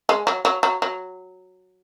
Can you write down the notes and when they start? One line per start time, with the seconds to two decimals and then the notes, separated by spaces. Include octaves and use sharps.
0.09 G#3
0.27 F#3
0.45 F#3
0.63 F#3
0.82 F#3